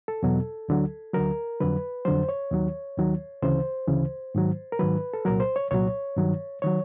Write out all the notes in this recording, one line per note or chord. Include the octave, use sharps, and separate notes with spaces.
A4
E2 B2 F#3
D2 D3 F#3
D2 D3 F#3 A#4
F2 D3 F#3 B4
F2 D3 F#3 C5
C#5
D#2 D#3 F#3
D#2 D#3 F#3
D2 C#3 E3 C5
D2 C#3 E3
G#2 D#3 F#3
A#4
G#2 D#3 F#3 B4
A4
C2 A#2 F#3 A#4
C5
C#5
C2 A#2 F#3 C#5
G2 D#3 F#3
D#3 F#3 C#5